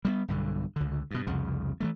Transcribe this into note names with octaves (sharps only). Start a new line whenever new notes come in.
G3 G#3 B3
B1 G2 D3
C#2 D3
G2 B2
C2 F2 C#3
E3 G3 A3